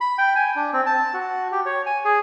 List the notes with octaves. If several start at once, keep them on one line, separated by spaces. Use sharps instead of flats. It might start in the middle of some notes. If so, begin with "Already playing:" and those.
B5
G5
G#5
D4
C4
A5
F#4
G4
C#5
G#5
G#4